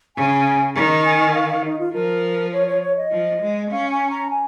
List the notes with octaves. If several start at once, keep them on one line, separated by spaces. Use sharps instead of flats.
C#3 G#5
D#3 A#5
G#5
F5
F5
D#4
F4
F3 A#4
C#5
C#5
C#5
D#5
F3
G#3
C#4 F5
G#5
A#5
G#5